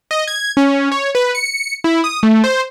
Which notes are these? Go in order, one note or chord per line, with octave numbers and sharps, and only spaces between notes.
D#5
G#6
C#4
C#5
B4
C#7
E4
D#6
A3
C5